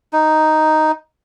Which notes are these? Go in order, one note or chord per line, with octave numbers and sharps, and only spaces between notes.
D#4